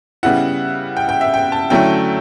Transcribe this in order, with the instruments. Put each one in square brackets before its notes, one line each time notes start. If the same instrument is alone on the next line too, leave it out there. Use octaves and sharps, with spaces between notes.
[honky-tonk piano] C#3 G3 B3 E4 F#5
G5
G5
E5
G5
A5
D3 F#3 A3 C#4 E4 G5